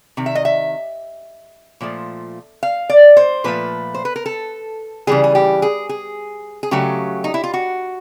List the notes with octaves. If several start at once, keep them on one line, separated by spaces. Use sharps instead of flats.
C3 D#3
E5
D#5
E5
A#2 F3 A3
F5
D5
C5
A#2 F3 A3 B4
C5
B4
A#4
A4
C#3 E3 G3 G#4
G#4
G4
G#4
G#4
G#4
C#3 F#3 A3 G4
D#4
E4
F4
F#4